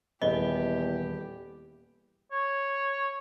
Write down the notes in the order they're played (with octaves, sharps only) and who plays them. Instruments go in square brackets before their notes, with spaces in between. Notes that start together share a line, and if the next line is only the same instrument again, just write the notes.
[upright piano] D#1 B4 G7 [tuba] E2 [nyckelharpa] G4 [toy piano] D#5
[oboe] C#5